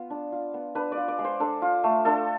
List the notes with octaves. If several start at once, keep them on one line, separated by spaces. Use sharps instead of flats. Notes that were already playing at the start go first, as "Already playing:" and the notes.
Already playing: B3 F4
D4
F4
B3
D4 B4
D5
F4
D5
G#3
C5
D4 A4
F4
A3
D4 A4